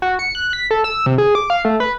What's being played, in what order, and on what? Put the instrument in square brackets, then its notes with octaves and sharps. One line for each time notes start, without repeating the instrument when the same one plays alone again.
[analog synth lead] F#4
C#7
F#6
B6
A4
E6
C3
G#4
D6
F5
A3
B4